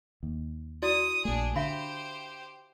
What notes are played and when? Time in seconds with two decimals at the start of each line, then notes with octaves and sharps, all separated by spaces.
0.23 D#2
0.82 E4 F#4 D5 D#6
1.25 A#1 A3 D4 G#4
1.56 D3 G4 C5 E5 F5 B5